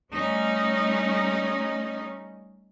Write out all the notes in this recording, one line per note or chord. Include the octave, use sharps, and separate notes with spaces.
G3 A3 C#4 D#4